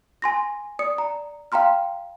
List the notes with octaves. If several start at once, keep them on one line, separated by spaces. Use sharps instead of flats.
G#5 C6 A#6
D5 D#6 C#7
A#5
F5 G5 A#5 C6 F6